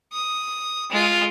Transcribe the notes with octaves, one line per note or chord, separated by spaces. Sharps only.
D#6
G#3 F4